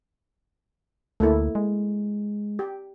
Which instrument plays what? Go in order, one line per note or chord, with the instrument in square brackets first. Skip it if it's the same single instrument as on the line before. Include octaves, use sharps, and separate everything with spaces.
[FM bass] D2 [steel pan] A3 A#3 E4
[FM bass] G#3
[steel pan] G4